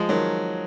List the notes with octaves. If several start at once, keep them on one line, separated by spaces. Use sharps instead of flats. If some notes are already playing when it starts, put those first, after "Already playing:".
Already playing: F3 G#3
D#3 F#3